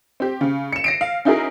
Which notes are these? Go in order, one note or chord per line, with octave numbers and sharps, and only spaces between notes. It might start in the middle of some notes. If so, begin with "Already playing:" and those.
C4 G4
C#3
C#7 E7
A#6 C7 D7
F5
C#4 D#4 E4 F#4 G#4 A#4